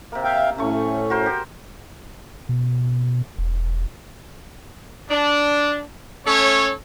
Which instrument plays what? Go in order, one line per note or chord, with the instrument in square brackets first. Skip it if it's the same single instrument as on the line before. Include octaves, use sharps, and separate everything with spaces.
[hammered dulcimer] C3 A#3
[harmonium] E5 F5 G5
[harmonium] A2 C#4 [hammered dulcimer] A3 C#6
[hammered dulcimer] F#4 A#4 C5
G4
[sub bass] B2
E1
[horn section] D4
A3 C#4 A4 C#5